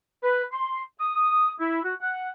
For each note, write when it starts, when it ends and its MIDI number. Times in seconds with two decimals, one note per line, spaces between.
0.23 0.43 71
0.52 0.81 84
0.99 1.52 87
1.59 1.82 64
1.83 1.93 66
2.00 2.28 78